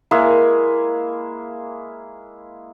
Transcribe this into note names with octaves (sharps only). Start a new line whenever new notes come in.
G#3 A#3 E4 G#4